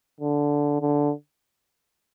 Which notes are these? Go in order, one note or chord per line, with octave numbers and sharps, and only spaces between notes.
D3
D3